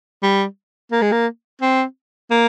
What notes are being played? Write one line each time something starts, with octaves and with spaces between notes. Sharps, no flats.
G3
A#3
G#3
A#3
C4
A#3